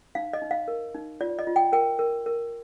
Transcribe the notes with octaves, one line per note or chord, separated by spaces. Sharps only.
D#4 F5
D#5
D#4
F5
A#4
D#4
F4 D5
D#5
F4
G5
A#4 G5
A#4
A#4